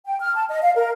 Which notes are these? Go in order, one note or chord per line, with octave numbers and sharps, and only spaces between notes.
G5
F6
A5
D#5
F5
A#4